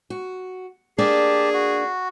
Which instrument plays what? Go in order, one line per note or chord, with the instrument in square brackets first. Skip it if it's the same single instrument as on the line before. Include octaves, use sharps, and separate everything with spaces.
[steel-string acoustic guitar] F#4
[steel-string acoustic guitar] A#3 D4 D5 [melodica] G4 A5 [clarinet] G#4
[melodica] F#4